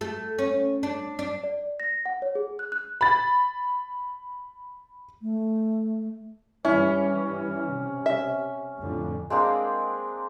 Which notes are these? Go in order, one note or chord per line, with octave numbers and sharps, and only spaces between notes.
A3
C#4
D4
D4
D5
A#6
F#5
C#5
G#4
F#6
F#6
B5 A6
A3
G2 E3 G3 C#4 E4
C3
E5
F2 A2 D3
G#3 A#3 C4 D4